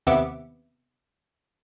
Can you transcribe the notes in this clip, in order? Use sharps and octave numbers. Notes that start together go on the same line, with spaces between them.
D#2 C3 B3 E5 D6 C#7